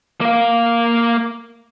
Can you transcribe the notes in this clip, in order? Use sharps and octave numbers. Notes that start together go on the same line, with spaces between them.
A#3 F5